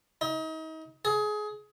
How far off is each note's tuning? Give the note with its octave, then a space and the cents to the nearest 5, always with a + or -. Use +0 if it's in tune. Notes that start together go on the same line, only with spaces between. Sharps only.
D#4 +35
G#4 +25